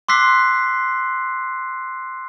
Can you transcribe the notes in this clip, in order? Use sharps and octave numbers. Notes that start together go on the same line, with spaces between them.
C6 D6 E6 F#6 B6 C7